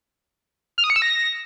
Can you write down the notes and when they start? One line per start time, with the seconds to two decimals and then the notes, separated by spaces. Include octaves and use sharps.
0.78 F6
0.84 D#6
0.90 C#7
0.96 E6
1.02 A#6